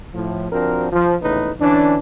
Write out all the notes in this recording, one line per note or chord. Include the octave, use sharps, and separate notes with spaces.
A2 F3
F3 C4 D4 F#4 A#4
F3
A#1 E2 A2 C#3 D#4 B4
D3 E3 C#4 D4